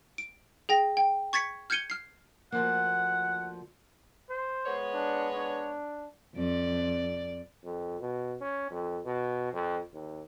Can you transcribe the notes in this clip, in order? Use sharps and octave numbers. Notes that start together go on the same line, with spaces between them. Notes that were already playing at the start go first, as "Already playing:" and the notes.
D7
G#4 G5 A#6
G5
C#6 G#6 A6 B6 C#7
F6 G6 G#6 C#7 D#7 G7
F6 C7
D2 F3 A#3 F#5
C5
G#3 B3 C#5
D4
D4
F2 D5
F2
B2
C#4
F2
B2
F2
D#2